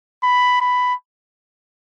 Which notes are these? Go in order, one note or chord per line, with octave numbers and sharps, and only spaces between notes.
B5
B5